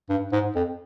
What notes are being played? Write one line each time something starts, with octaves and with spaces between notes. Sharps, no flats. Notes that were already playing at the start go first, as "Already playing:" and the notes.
G2
G#2
F2